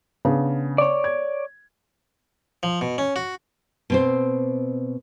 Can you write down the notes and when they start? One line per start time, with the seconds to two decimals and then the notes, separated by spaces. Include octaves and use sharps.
0.25 C#3 B3 D4
0.78 C#5 D5
1.04 G#6
2.63 F3
2.81 B2
2.98 C#4
3.16 F#4
3.90 B2 C4 C5